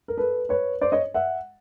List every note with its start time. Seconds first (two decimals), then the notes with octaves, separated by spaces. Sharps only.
0.08 A#4
0.18 A4 B4
0.49 B4 C#5
0.81 C5 D5
0.92 C#5 D#5
1.14 E5 F#5